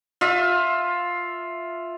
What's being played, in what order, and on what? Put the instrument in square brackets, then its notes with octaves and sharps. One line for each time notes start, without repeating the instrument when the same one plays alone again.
[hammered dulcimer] F4 E5